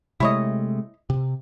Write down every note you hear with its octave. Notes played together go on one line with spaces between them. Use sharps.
C3 G#3 A3 E4 C#5 D#5
C3